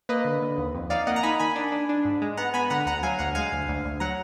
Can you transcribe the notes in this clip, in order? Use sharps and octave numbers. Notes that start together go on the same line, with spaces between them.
A#3 B4 D#5
D3
D3
D#2
F2
D#4 D5 F5
A#3 D#5 F#5
A#5
D#4 G#5 B5
D#3 G#5 B5
D4
D4
D4
G#2
G#3
B3 F#5 A#5
B3 G#5 B5
D3 F#5 A#5
D2 F#5 A#5
F#3 F5 G#5
D2 F#5 A#5
G#3 F5 G#5
D2
D2
D2
F#3 F#5 A#5